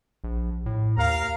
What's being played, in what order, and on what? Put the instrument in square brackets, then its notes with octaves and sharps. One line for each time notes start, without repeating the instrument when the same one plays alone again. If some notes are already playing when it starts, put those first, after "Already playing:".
[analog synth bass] A#1
A2
[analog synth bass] D#2 [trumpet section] A#4 F5 A#5